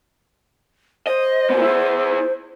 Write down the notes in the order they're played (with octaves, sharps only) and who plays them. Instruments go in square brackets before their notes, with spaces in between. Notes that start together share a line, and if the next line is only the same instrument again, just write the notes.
[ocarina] C5 [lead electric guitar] D#5
[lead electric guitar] A#2 B3
E4 G#4